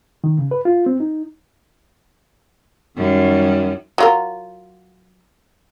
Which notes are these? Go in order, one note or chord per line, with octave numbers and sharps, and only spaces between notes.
D#3
C#3
B4
F4
C4
D#4
F#2 D#3 G3
F#3 F4 A#4